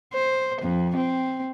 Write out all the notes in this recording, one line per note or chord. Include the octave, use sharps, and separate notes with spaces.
C5
F2
C4